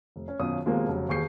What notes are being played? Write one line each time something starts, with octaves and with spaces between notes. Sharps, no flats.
F1
C#4
G#1 F#2 B2 C#4 F4 D#6
D#2 B2 F3 G#3 A#3 C4
F1 C#3 F#3
E1 D#2 G#4 C#6 G6 C7